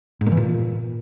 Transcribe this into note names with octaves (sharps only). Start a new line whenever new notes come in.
G#2
A#2
E3
A#2